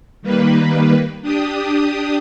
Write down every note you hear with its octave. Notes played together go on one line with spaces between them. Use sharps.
D#3 G3 A#3 B4
D4 G4 D#6